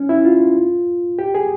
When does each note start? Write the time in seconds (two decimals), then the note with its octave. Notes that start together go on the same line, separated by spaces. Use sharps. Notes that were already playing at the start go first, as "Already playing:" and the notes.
Already playing: C#4
0.09 E4
0.25 F4
1.19 G4
1.35 G#4